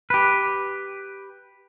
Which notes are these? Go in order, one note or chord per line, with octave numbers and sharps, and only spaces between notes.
G4 B4